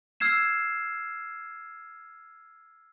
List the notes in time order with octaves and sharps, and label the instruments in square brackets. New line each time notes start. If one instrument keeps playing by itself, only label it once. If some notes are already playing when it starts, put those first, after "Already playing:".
[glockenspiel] E6 F6 G#6 C7 E7